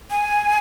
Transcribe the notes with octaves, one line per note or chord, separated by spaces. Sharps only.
G#5